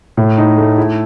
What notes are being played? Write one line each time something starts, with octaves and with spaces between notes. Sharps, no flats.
A2
D#4
A3
E4